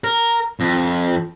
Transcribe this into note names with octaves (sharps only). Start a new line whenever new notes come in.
A#4
F2